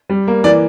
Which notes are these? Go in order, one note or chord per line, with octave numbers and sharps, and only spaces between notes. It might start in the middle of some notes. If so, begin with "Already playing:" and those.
G3
A#3
E3 D5